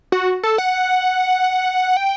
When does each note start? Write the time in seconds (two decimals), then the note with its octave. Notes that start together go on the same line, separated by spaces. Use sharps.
0.12 F#4
0.43 A4
0.58 F#5
1.97 G5